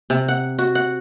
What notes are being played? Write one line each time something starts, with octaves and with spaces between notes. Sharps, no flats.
C3
F#5
F#4
F#5